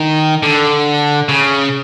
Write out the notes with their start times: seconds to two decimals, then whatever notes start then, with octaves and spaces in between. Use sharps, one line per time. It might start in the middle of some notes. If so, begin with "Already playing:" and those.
Already playing: D#3
0.43 D3
1.29 C#3